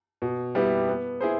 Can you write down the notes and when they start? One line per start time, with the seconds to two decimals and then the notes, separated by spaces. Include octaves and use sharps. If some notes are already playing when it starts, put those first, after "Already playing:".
0.22 B2
0.55 G3 B3 E4 G4
0.89 B3
1.21 E4 G#4 C5